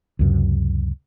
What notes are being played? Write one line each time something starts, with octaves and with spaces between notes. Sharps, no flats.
C#2 F#2 C3